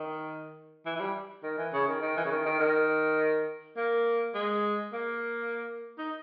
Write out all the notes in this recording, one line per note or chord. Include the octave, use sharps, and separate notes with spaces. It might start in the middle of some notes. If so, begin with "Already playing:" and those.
Already playing: D#3
E3
E3
G3
D#3
E3
C#3
D#3
D#3
E3
C#3
D#3
D#3
D#3
A#3
G#3
A#3
D#4